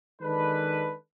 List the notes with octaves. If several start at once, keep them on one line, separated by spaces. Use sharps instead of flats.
D#3 G#3 D4 A4 B4